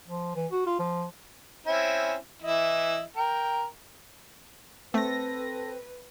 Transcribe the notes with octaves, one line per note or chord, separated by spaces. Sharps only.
F3
E3
F#4
F4
F3
C4 C#4 E4
E3 E4 D#5
A#4 G5
A3 C4 A4 B4 A#6